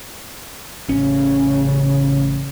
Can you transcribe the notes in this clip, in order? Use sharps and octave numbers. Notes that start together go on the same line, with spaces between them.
A1 C#3 C#4